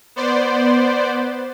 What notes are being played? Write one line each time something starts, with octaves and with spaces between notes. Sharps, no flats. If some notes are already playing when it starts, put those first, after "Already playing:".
B3 C5 D5